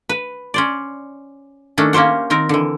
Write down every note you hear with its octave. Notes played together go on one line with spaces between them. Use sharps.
B4
C#4 C5 D5
D#3 A3 C#4 D4
A#3 C#4 G4 C5 F#5
D#3 C4 A#4
D3 E3